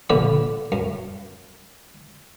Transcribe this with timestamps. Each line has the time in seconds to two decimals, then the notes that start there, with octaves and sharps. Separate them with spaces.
0.10 A#1 D3 D5 B5
0.72 F#2